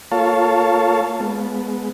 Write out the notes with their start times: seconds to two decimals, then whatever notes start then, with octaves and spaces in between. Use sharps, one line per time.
0.11 A#3 F4 A4 C#5 F5 A5
1.20 G#3 B3